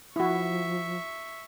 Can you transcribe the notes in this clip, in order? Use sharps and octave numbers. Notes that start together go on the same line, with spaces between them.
F3 E4 F#4 E5 C#6